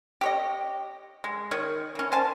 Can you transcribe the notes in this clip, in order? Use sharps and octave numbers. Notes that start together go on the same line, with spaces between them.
G4 C#5 D#5
G#3
D#3 C#5 D#5
E3 C#4
C5 G#5 A5